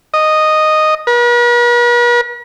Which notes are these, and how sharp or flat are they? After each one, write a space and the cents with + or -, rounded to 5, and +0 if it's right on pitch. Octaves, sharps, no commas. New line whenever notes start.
D#5 -5
B4 -45